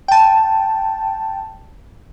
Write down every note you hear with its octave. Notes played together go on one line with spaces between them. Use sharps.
G5 A5